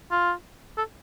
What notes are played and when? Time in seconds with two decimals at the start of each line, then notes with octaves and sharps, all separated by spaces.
0.11 F4
0.77 A4